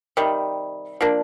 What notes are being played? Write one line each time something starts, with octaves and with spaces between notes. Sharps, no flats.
C3 D#3 G3
F3 A#3 D4